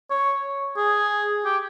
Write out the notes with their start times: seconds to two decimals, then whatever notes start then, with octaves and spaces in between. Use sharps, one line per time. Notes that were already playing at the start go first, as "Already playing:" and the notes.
0.10 C#5
0.77 G#4
1.45 G4